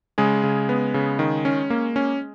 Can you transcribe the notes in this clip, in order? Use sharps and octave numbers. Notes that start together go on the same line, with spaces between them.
C#3 G#3 G#4
C#3
B3
C#3
D#3
C#4
A#3
C#4